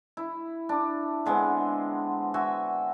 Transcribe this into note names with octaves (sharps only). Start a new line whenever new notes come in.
E4
D4
D3 G#3 B3 C4
F#4 E5 G#5